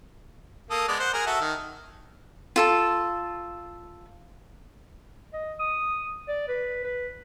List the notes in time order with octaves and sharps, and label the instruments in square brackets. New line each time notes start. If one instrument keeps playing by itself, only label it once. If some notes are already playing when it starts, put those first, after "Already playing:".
[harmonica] A#3 A4 D#6
G#3 B3 D5
C5 F#5
G#4 A#4
F#4 A4 E5
D#3
[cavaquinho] F4 A4 A5
[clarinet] D#5
D#6
D5
B4
B4